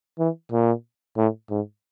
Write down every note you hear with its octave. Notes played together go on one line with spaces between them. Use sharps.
E3
A#2
A2
G#2